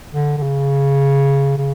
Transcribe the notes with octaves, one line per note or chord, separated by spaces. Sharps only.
D3
D3
C#3
C#3